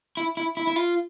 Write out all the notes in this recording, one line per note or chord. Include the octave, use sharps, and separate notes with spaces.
E4
E4
E4
E4
F4